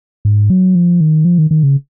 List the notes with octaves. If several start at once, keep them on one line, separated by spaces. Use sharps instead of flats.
G#2
F#3
F3
D#3
F3
D#3
D#3
C#3